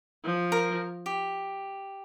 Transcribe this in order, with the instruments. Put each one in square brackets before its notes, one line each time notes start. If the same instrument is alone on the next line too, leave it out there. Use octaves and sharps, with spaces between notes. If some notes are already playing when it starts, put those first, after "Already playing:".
[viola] F3
[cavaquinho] A#4
G4